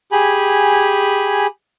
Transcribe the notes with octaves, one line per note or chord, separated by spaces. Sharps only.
G4 G#4 G#5 B5